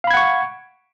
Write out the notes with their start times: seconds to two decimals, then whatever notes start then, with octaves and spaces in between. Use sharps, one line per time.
0.04 F5
0.07 B5
0.11 G#6
0.14 F#5
0.17 C#6